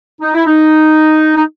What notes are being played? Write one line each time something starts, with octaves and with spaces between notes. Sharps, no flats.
D#4
E4
D#4
D#4